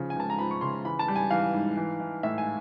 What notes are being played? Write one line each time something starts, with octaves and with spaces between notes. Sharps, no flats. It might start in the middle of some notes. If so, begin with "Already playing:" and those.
Already playing: C#3 F3
G#5
C#2 A5
A#5
F3 B5
C#6
C#3 C6
E3 B5
A5
G3
G#5
E3 F5
G#2
E3
E3
A2 E5
G#5